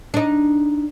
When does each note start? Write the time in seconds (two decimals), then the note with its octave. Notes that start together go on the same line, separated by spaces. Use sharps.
0.14 D4 D#4